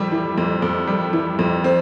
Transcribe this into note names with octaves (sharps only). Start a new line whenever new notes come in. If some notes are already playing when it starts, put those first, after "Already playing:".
Already playing: F2 G3
E3
F2
F2
G3
E3
F2
C4